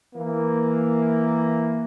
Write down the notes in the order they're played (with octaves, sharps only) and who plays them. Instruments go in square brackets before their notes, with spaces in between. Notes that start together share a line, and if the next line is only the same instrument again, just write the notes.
[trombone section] E3 A#3